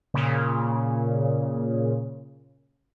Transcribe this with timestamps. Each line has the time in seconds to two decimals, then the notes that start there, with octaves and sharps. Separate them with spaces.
0.14 A#2 C#3